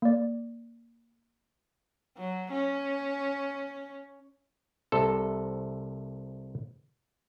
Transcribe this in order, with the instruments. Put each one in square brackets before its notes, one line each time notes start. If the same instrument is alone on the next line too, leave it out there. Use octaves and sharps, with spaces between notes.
[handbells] A#3 D5
[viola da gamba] F#3
C#4
[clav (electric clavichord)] C2 C3 A4